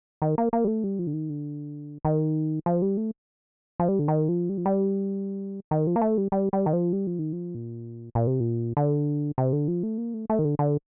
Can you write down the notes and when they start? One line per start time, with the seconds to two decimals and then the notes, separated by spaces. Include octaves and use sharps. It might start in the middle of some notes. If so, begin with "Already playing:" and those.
0.22 D#3
0.38 A#3
0.53 A#3
0.64 G3
0.67 A3
0.84 G3
0.99 F3
1.07 D3
1.13 D#3
1.29 D3
2.05 D#3
2.66 F3
2.82 G3
2.97 A3
3.79 F3
3.88 G3
3.99 D3
4.08 D#3
4.29 F3
4.49 G3
4.58 F3
4.66 G3
5.71 D#3
5.87 F3
5.96 A#3
6.02 A3
6.18 G3
6.32 G3
6.53 G3
6.66 D#3
6.73 F3
6.93 G3
7.07 F3
7.19 D#3
7.33 F3
7.55 A#2
8.15 A#2
8.27 C3
8.40 A#2
8.77 D3
9.38 C3
9.53 D3
9.68 F3
9.83 A3
9.98 A#3
10.14 A3
10.30 A3
10.39 D#3
10.45 D3
10.59 D3